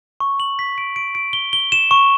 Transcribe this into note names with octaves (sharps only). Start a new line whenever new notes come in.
C#6
F#7
B6
D7
D7
D7
G7
G7
E7
C#6